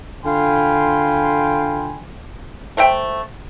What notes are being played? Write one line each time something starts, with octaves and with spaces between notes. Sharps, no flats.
D3 F4 G5 G#5 B5 C6
A3 C5 E5 G5